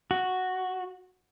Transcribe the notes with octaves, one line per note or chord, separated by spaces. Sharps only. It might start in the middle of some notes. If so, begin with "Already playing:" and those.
F#4